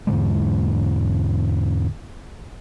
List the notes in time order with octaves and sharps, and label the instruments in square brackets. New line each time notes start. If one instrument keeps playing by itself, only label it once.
[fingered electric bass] E2 G#2 D3 G#3